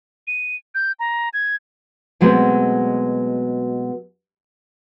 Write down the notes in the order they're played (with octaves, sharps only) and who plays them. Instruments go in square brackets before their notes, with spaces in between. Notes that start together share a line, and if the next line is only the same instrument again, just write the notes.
[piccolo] D#7
G6
A#5
G#6
[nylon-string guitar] B2 F#3 G#3 A3 B3 C4